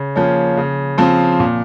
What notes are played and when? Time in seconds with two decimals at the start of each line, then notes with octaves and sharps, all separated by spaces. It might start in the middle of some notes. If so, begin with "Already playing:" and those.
Already playing: C#3
0.16 F3 A#3 C#4
0.57 C#3
0.98 F3 C4
1.40 A#2